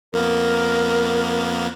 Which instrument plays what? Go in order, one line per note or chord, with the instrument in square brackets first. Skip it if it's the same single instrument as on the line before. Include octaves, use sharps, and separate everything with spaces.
[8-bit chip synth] F2 A#3 B3 [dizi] A#4